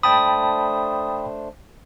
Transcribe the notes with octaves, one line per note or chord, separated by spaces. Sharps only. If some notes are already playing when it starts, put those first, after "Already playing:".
A3 D4 C5 G5 A5 B5 D#6